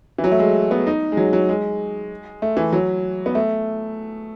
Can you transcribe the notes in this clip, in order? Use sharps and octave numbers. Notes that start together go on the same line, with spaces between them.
E3
F#3
A3
G#3
B3
D#4
G#3
F#3
F#3
G#3
A3
E3
F#3
B3
A3